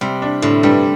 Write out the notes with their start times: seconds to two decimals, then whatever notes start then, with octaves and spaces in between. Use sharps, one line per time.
0.01 C3 G3
0.22 D4
0.42 A2 D3
0.63 G2 G3